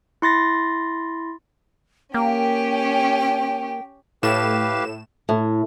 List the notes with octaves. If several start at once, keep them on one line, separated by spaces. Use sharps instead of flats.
E4 C6 A6 A#6
A#3 C#4 G4 G5
A2 G4 B4 F5 E7
A2